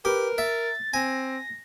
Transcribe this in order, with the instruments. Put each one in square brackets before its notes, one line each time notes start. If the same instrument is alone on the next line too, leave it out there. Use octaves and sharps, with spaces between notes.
[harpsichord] G4 [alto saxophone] A#4 [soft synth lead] B4
[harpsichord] E5 [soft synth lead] A6
[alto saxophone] C4 [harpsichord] G#5 [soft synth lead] A#6